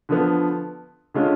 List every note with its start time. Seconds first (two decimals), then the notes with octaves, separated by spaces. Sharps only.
0.09 D3 F3 B3
1.14 D3 G#3 C#4 F4